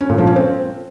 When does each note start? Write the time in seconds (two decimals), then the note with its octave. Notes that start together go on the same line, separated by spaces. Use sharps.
0.01 C#4
0.09 A#2
0.18 F3
0.27 C#4
0.36 C4